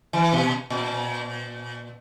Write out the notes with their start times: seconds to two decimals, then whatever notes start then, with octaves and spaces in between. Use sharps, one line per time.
0.13 E3
0.33 B2
0.70 A#2